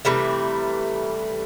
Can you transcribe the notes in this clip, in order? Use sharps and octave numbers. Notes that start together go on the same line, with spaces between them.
C3 E3 G3 A3